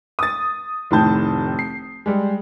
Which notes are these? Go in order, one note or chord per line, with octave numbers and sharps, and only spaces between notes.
D#6 A6
F1 A2 D#3 A5 G6
C7
G3 G#3